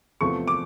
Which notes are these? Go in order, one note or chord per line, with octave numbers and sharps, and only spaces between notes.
E2 C3 F3 A3 C#6
D6